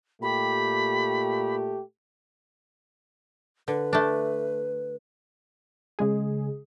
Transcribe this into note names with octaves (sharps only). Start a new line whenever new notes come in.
A#2 A3 G4 B5
D3 B4
A3 D4
C#3 G#3 G#4